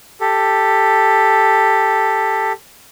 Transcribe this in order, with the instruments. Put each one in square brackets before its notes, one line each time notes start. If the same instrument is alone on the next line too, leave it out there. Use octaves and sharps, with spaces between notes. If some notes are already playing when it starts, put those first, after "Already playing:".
[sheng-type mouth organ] G4 A4